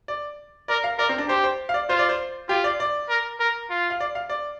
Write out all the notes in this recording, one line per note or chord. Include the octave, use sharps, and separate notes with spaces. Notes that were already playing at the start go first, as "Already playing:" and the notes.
D5
A#4 D5
F5
A#4 D5
C4
D4
G4 C5
C5
F5
D5
F4 C5
D5
C5
F4 G4
D5
D5
A#4
A#4
F4
F5
D5
F5
D5